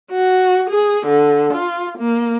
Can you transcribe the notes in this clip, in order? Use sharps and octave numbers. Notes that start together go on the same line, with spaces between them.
F#4
G#4
D3
F4
A#3